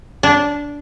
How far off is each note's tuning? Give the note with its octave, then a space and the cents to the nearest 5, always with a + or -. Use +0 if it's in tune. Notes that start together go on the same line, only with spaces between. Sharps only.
D4 -15